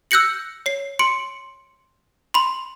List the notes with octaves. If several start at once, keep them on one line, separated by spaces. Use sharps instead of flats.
E6 F#6 G6 A#6 C#7 F#7
C#5 C7
C6 C#7 D7
B5 C6